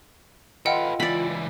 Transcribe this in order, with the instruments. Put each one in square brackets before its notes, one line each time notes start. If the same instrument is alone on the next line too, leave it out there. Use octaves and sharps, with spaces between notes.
[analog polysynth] F4 [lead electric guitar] A4 B4 [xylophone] D#5 F#5 G5
[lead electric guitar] C#2 E3 [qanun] D5 B5